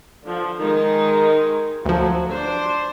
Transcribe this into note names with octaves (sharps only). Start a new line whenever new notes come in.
D3 F3
D#3 G#3 D#4
D2 F3 F#3
D4 C5